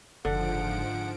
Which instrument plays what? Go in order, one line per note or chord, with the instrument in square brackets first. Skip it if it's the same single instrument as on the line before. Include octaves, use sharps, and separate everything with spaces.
[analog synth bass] F#1 [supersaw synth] G#2 F3 D7 [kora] D3 [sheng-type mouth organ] F#5